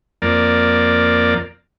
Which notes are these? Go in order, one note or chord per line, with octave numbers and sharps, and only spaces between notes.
F2 A#3 D5